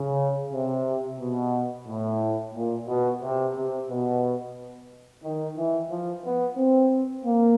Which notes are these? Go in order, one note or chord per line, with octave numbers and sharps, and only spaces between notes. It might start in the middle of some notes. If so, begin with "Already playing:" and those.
Already playing: C#3
C3
B2
A2
A#2
B2
C3
C3
B2
D#3
E3
F3
B3
C4
A#3